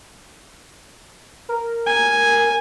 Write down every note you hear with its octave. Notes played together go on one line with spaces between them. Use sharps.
A#4
G#5